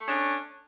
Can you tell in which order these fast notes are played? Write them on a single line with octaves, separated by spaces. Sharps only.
A3 C#4 D4